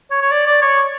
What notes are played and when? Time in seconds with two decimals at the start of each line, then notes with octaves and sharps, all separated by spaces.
0.11 C#5
0.21 C#5
0.31 D5
0.46 D5
0.62 C#5